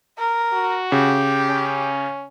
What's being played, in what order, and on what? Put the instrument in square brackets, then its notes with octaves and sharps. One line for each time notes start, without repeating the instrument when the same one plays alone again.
[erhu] A#4
[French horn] F#4
[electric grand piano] C#3 [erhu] G4
[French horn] C#4